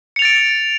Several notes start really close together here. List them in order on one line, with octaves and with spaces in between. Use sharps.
C#7 F7 A6 D7